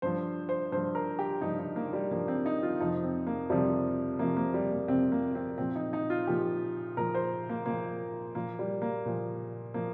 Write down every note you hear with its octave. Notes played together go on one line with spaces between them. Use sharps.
G2 F3 C5
C5
G2 F3 C5
A#4
G4
G2 F3 D#4
D#4
A#3
G3
G2 F3 A#3
C4
D#4
F4
F2 C3 F3 D#4
C4
A#3
F2 C3 F3 G3
F2 C3 F3 A#3
A#3
G3
A#3
F2 C3 F3 C4
A#3
C4
A#2 F3 C4
D#4
D#4
F4
A#2 F3 G4
A#2 F3 A#4
C5
A#3
A#2 F3 A#3
A#2 F3 A#3
G3
A#3
A#2 F3
A#2 F3 A#3